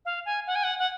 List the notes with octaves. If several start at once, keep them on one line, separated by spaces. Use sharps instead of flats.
F5
G#5
F#5
G#5
F#5
F#5